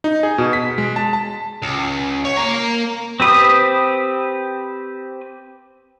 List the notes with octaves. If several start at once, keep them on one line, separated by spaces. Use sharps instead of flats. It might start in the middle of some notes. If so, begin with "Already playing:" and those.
D#4
G#4
B2
B6
G#3
A5
A5
C#2
C#5
A#3 A#5
C4 G4 B4 C5 D#6